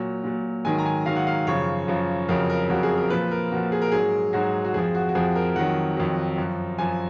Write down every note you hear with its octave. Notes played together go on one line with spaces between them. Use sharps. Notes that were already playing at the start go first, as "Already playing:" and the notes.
Already playing: A#2 F#3
A#2 F#3
G#2 D#3 F#3 G#5
A#5
G#5
G#2 D#3 F#3 F5
F#5
F5
F#2 C#3 F3 C#5
F#2 C#3 F3
F2 C#3 F#3 A#4
A#4
F2 C#3 F#3 F#4
G#4
A#4
A#2 F3 B4
A#4
A#2 F3 F#4
G#4
A#4
G#2 F#3 G#4
G#2 F#3 F#4
F#4
F2 F3 G#4
F#4
F#4
F2 F3 G#4
A#4
F2 D#3 F#3 F#5
F2 D#3 F#3
F#2 F3
F#2 F3 G#5